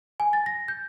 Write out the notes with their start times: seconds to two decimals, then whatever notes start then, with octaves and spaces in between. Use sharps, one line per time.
0.20 G#5
0.33 A6
0.46 A#6
0.68 G6